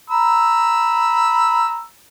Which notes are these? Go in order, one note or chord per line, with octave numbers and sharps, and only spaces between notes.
A#5 B5 E6